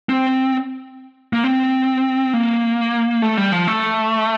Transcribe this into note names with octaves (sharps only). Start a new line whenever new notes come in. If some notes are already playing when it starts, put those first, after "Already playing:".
C4
A#3
C4
A#3
A3
G3
F3
A3